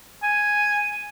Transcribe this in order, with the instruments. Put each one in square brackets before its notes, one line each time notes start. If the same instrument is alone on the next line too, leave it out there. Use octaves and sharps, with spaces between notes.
[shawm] G#5